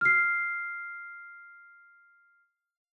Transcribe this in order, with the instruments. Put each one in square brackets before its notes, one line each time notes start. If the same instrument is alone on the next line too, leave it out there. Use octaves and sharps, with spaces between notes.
[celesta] F6 C7